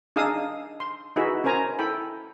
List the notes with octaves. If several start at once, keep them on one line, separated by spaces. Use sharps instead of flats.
D4 D#4 G#4 F5 D#6 E6
C6
D#4 E4 F#4 G#4 B4 E5
C#4 A#4 C5 G#5 A#5
E4 A4 G5 B5